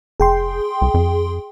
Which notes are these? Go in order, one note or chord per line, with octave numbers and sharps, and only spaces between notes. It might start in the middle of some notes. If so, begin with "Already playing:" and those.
F1 G#4 G5 C6
C2
F2